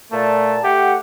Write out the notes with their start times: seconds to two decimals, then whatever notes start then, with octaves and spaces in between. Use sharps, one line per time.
0.12 A#2 A3 A5
0.64 A3 G4 F#5